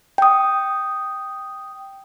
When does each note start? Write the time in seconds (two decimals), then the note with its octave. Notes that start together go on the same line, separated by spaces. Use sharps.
0.18 G5 D#6